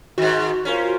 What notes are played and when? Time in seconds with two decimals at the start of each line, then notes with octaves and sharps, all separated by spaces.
0.18 G#2 D#3 F#4
0.65 C#4 F4 A#4 C5